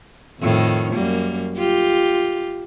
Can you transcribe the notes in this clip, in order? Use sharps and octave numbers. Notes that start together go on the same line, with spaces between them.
F2 A2 D#3
F#2 G3 A#3
F4 G4